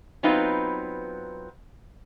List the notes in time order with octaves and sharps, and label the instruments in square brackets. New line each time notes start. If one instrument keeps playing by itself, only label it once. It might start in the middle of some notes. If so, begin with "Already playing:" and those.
[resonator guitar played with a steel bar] F#3 B3 C4 D#4 F4 B4